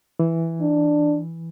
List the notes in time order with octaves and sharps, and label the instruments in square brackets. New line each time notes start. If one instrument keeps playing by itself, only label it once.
[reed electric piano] E3
[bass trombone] D4